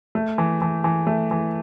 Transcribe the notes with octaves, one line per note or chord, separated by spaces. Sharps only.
A3
E3
E3
E3
A3
E3